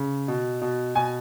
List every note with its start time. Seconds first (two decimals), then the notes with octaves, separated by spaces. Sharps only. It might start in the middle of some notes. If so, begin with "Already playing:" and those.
Already playing: C#3
0.28 B2
0.61 B2
0.95 B2 G#5